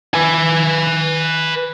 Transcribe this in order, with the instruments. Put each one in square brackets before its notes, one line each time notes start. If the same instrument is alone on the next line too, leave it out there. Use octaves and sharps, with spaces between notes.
[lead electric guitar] B4 G#5